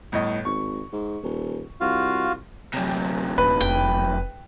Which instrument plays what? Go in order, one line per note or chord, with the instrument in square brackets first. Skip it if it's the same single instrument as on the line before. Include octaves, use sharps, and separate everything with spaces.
[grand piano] G1 A2 D#5
[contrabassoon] G#1 [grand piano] C#6
[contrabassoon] G#2
D#1
[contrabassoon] C2 [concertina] F4 F#4 F5
[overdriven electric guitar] F#2 C3
[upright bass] D#1 [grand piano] B4
[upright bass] F1 [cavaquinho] G5